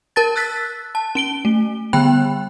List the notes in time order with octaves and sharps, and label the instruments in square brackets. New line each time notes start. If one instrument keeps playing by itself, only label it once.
[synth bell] A#4 A5 A6
E6 F#6 A6 B6
A5
C#4 D7 G7
A3
D3 G3 B3 G5 B5 F#6